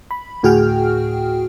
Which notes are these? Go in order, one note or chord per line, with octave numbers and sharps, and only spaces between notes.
B5
D2 A2 F#4 G#4 G5 F6